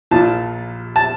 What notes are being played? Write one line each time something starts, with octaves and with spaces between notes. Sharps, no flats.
A#1 A#2 F3 A5
A5